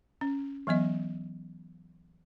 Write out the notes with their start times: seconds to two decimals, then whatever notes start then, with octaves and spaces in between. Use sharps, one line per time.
0.21 C#4
0.67 E3 F#3 B3 D#5